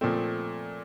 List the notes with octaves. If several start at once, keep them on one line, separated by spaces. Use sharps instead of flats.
A#2 F3 A3 C4